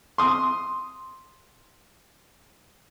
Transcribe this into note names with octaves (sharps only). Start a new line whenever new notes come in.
C6 D#6